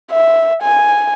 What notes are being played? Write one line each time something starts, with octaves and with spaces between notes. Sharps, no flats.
E5
G#5